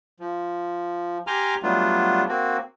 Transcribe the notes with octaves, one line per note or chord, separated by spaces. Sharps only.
F3
G4 G#5 A#5 C6 D6 F6
F#3 G3 A3 B3 D4 F4
A#3 C4 F#4